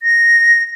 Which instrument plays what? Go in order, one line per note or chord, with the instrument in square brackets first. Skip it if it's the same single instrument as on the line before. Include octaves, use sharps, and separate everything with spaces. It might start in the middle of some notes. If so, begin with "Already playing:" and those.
[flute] A#6